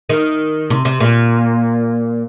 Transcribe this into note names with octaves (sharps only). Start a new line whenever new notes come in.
D#3
C3
C3
A#2